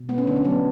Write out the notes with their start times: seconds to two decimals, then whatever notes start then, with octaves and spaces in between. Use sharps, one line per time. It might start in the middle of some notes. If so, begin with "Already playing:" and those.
Already playing: B2
0.09 A3 B3
0.18 C#4
0.27 D3 D4
0.36 C#4
0.45 F#3 B3